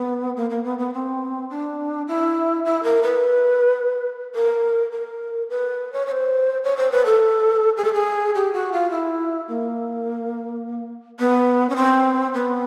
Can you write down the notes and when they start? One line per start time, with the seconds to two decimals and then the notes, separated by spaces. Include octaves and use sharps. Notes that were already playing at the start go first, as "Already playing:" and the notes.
Already playing: B3
0.36 A#3
0.50 A#3
0.64 B3
0.78 B3
0.93 C4
1.50 D4
2.08 E4
2.65 E4
2.83 A#4
3.03 B4
4.35 A#4
4.92 A#4
5.50 B4
5.93 C#5
6.07 C#5
6.12 C5
6.64 C#5
6.77 C5
6.92 B4
7.06 A4
7.77 G#4
7.84 A4
7.93 G#4
8.35 G4
8.53 F#4
8.72 F4
8.91 E4
9.48 A#3
11.19 B3
11.69 C#4
11.76 C4
12.34 B3